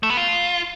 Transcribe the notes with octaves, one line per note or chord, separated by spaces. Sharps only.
A3
B3
F4